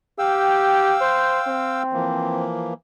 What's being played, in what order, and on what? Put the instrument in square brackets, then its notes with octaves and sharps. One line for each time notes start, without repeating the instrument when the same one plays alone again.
[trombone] G4 [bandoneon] F5 G5 E6
[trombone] C5
C4
[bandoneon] E3 F3 A#3